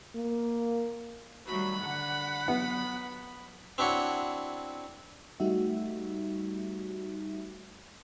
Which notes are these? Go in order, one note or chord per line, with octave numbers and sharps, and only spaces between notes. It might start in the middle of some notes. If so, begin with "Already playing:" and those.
A#3
D#3 F#3 G3 A3 B5
D3 F#5
F#3 B3
C4 D4 E4 F#4 C#5
G3 A3 D#4 F#4 G4 E5